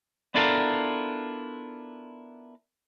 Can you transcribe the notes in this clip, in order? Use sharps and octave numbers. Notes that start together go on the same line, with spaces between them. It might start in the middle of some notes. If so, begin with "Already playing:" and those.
B3 D4 E4 F4 A4 A#4